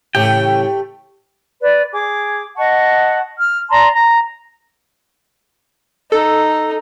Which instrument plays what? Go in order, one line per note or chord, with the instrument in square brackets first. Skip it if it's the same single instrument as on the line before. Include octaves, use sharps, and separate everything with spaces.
[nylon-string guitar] A2 C#3 E3 [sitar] A3 G4 [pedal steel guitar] G5
[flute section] B4 D5
G#4 D6
D#5 F#5 A5 C#6
F6
D5 A5 A#5 C6
A#5
[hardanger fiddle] D#4 [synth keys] A4